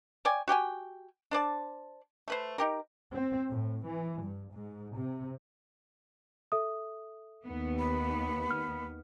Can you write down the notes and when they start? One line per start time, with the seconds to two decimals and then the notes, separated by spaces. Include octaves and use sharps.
0.25 C#5 D5 G5 G#5
0.48 F#4 G4 G5 G#5
1.31 D4 C5 D5 A5
2.28 A3 B4 C5
2.58 D#4 G4 A#4
3.12 C4
3.50 A2
3.85 E3
4.20 G2
4.53 G#2
4.96 C3
6.52 A4 E5 D#6
7.47 D#2 B3
7.79 B5
8.51 F6